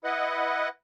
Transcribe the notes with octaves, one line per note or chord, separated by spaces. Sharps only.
E4 B4 D#5 F#5